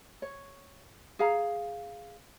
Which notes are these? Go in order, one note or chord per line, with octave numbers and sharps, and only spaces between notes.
C#5
G#4 F5 A#5